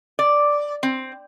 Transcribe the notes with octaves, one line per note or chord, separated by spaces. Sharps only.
D5
C4